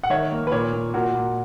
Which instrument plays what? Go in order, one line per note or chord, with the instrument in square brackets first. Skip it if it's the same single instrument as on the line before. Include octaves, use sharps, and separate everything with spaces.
[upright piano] F#5
D#3 C#5 E5
A#3
B4
A#2 A#4 C#5
A#2
A#2 F#4 A#4
A#2